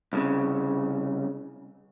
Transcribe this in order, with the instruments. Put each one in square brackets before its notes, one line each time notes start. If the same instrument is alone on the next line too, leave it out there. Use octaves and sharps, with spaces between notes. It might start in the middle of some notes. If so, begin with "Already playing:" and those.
[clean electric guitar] C2 A2 C#3